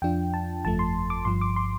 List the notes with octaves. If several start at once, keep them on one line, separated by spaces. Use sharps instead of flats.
F2 F3 D4 F4 G5
A5
G1 F2 F3 A3 A5
C6
D6
G1 G2 F3 C6
D6
C6